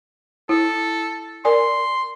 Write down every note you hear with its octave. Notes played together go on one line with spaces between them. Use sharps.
E4 A4
A#4 D5 G#5 C6